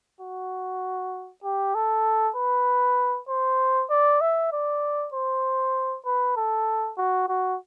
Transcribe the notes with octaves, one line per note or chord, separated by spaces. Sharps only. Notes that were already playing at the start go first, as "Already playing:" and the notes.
F#4
G4
A4
B4
C5
D5
E5
D5
C5
B4
A4
F#4
F#4